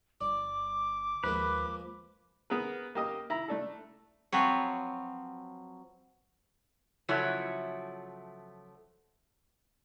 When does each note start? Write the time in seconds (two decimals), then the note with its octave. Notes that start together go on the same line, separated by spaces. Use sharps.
0.21 G1 D5 D6
1.24 D#2 F3 G#3 A#3 B4
2.50 B3 G#4 A#4 B4
2.95 A#3 G4 D#5 D#6
3.30 E4 A#5
3.48 A3 D4 A4
4.32 F3 F#3 C4 B4 C#5
7.09 C#3 F3 F#3 A3 E4 C#5